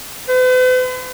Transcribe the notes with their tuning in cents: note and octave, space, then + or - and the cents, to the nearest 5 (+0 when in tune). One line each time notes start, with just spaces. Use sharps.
B4 +45